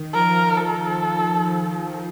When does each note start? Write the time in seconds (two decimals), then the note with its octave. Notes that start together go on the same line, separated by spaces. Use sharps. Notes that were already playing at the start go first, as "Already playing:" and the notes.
Already playing: D#3
0.14 F3 A#4
0.56 A4